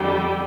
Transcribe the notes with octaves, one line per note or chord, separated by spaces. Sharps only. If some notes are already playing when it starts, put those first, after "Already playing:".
Already playing: F2 D3 G3 G5